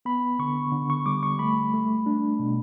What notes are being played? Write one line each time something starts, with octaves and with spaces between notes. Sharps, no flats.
B3 B5
D3 C#6
D3
C#6
G3 D6
C#6
A3 B5
A3
D4
B2